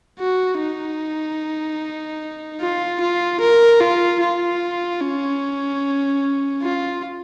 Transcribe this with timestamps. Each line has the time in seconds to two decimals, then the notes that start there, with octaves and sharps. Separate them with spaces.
0.20 F#4
0.59 D#4
2.60 F4
3.00 F4
3.40 A#4
3.81 F4
4.20 F4
5.01 C#4
6.62 F4